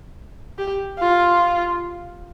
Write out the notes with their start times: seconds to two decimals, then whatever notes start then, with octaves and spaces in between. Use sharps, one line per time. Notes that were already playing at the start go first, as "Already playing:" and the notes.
0.59 G4
1.00 F4